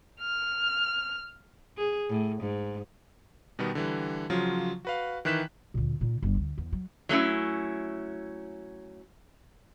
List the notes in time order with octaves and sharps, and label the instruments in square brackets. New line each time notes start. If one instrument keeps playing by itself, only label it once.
[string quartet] F6
[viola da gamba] G#4
A2
G#2
[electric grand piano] B2 D#3 G3 B3
D3 E3 G3
C#3 F3 F#3 F4
F#4 B4 F5
D#3 E3 E4 F#6 B6 E7
[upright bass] D2 A#2
A#2 D#4
G1 G3
D2
E2
F#3
[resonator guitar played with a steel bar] F#3 A3 C#4 E4